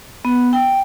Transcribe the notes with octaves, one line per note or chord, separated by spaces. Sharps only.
B3
G5